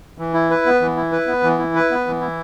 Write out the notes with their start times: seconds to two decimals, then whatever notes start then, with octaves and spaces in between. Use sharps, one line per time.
0.18 E3
0.34 E4
0.50 B4
0.66 B3
0.81 E3
0.96 E4
1.12 B4
1.27 B3
1.43 E3
1.59 E4
1.75 B4
1.91 B3
2.07 E3
2.21 E4